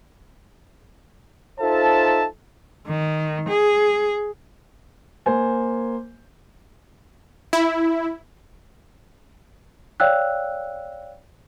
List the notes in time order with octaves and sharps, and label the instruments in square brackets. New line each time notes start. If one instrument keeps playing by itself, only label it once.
[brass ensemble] D#4 F4 A4 C5 E5 A5
[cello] D#3
G#4
[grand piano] A#3 C5 G#5
[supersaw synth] E4
[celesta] C#5 D5 F5 G5 E6 F#6